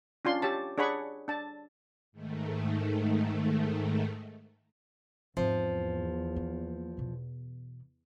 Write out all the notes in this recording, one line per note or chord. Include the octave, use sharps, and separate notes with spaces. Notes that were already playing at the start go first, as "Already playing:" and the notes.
C#4 D4 F4 C6
G4 C#5 A5
D4 G#4 C#5 F#5 B5 C#6
D4 A5
G#2 D#3 A3
E2 G#2 F3 C4
A#3
B2 E3